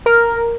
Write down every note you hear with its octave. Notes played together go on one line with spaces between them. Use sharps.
A#4